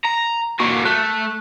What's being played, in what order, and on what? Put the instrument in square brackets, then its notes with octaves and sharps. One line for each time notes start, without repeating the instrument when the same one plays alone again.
[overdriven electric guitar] A#5
[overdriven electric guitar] A#3 F#4 [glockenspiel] C#6
[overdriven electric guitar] A3 [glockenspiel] F#6